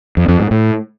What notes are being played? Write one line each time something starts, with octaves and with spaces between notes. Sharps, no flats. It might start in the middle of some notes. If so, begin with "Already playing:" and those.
F2
F2
G#2
A2